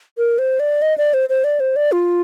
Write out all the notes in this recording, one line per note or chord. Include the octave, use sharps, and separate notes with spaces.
A#4
C5
D5
D#5
D5
C5
C5
D5
C5
D5
F4